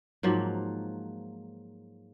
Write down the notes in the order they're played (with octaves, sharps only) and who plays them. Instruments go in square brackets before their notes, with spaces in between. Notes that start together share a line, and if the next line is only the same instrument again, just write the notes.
[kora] G#2 F3 F#3 A#3